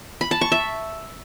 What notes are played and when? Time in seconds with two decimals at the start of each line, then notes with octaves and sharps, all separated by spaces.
0.21 B5
0.31 A5
0.41 C#6
0.52 E5